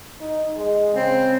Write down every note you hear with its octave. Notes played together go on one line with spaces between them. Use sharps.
D#4
G#3
C#3 C4